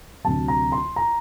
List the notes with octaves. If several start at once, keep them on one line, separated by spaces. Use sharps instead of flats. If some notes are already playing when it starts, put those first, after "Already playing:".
D2 C3 F#3 A5
A#5
C6
A#5